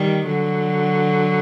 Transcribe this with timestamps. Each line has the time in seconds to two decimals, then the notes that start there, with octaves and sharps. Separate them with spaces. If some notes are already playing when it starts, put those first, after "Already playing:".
Already playing: D#3 G3
0.26 D3 F#3